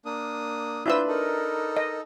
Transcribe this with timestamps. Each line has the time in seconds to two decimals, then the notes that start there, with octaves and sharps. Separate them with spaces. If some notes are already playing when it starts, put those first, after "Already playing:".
0.05 A#3 D4 D#6
0.86 D4 E4 F4 B4 E6 G6
1.08 D#4 A4 A#4
1.77 D#5